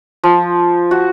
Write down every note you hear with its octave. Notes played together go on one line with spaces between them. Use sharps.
F3
F#4